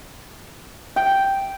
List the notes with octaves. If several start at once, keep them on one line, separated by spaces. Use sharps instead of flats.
G5